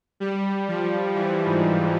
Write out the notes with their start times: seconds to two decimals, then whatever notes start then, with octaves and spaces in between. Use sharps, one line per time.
0.20 G3
0.68 F3
1.15 E3
1.46 G#2